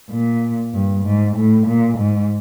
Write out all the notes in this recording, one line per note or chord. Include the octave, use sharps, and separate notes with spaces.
A#2
G2
G#2
A2
A#2
G#2